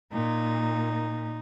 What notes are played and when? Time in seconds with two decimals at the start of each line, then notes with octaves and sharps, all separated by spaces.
0.13 A#2 D#4